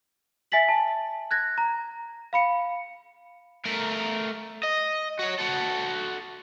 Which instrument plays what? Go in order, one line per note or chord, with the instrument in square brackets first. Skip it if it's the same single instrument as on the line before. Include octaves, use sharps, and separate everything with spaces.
[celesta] E5 G#5 A6 B6 F#7
A5
F#6 G#6 A#6
A#5
F5 B5 C#7
[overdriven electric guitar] A3 A#4
D#5
F#4 C#5
F#4 A4